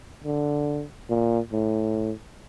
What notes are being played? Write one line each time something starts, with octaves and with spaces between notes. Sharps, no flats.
D3
A#2
A2